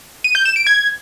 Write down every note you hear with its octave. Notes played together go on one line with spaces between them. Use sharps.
D#7
G6
E7
D7
G#6